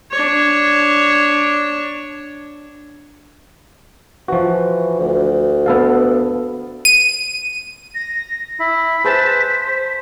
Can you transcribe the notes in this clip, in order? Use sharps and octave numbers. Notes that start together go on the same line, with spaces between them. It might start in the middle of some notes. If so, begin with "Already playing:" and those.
D4 C#5
E3 F3 F#4
D2
B3 A4 F5
D#7
A#6
E4 B6
G#4 B4 C5 A5